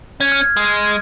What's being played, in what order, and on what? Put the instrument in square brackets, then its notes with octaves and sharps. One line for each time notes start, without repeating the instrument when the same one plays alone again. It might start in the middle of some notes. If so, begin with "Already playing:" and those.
[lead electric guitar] C#4 [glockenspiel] G#6
[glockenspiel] F6
G#6
[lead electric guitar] G#3